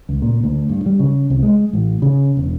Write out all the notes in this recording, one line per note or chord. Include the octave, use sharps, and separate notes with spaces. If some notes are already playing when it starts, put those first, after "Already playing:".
C#2
A#2
D2
G2
G3
C#3
C2
G#3
A1
C#3
E1